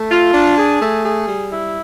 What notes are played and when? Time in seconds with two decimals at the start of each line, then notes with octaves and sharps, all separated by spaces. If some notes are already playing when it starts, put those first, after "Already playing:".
Already playing: A3
0.10 F4
0.34 D4
0.57 G#4
0.81 A3
1.04 G#4
1.28 G3
1.52 E4